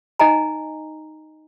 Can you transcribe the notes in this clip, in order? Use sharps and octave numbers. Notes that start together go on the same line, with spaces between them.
D#4 D#5 G#5 A#5